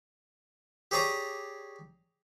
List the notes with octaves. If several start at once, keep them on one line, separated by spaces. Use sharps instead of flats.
G4 G#4 C#5 D5 A#5